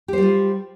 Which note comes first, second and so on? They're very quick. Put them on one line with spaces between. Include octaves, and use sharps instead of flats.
G4 C5 G3 F4